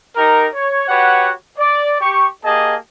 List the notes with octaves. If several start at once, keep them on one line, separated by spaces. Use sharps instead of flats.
D#4 G4 A#4
C#5
F#4 G4 B4 C#5 F#5
D5
G4 C#6
A#3 G4 G#4 D#5 A5